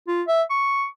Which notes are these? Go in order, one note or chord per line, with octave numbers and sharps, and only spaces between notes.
F4
E5
C#6